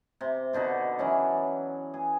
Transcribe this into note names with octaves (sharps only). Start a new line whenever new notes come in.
C3
B2 D3 D#4 F#4
E3 F#3 C#4
G#4